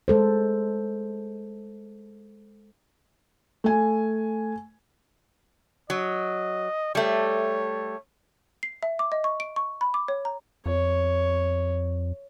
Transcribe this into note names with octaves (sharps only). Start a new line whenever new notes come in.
G#3 A4 C5
A3 G#5
F#3 D#5
G3 A3 C#5
C7
E5
D6
D#5
C#6
D7
C#6
B5
D6
C#5
A#5
F2 C#5